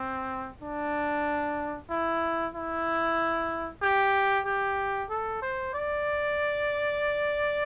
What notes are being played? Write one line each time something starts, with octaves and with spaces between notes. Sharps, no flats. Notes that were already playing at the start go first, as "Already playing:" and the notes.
Already playing: C4
D4
E4
E4
G4
G4
A4
C5
D5